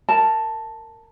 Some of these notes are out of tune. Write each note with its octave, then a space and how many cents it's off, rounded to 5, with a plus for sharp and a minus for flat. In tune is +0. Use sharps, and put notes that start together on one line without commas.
A#4 -15 A5 +0